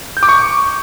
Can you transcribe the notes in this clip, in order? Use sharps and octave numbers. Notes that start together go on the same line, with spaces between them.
G6
D6
C#6